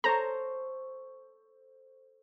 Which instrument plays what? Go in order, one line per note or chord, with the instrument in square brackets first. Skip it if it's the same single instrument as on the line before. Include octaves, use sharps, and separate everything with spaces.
[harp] A4 C5 C#6 [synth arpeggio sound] A#5